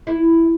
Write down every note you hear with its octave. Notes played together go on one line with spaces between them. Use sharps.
E4